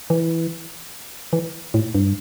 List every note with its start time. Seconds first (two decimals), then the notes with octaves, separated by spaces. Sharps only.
0.10 E3
1.33 E3
1.74 A2
1.95 G2